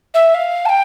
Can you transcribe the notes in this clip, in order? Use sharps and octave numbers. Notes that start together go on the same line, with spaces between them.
E5
F5
A5
G5